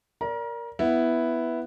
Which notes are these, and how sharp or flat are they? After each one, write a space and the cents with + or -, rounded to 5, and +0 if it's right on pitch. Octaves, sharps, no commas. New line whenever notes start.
A#4 +0 D5 -20 A#5 +35
B3 +0 E4 +0